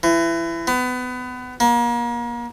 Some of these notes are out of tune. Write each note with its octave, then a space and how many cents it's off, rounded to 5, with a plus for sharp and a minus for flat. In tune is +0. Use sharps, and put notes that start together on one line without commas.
E3 +25
B3 +25
A#3 +35